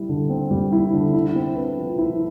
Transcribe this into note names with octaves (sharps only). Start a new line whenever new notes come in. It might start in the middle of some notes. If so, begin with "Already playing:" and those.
Already playing: G3 E4
D3
C4
G3
E4
D3
E4
C4
B4
F3
E4